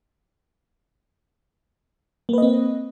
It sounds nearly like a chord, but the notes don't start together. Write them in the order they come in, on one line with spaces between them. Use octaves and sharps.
A#3 B4 D#5 C4